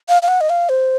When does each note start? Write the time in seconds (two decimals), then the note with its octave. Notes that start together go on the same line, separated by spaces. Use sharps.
0.09 F5
0.22 F5
0.28 F#5
0.41 D#5
0.50 F5
0.69 C5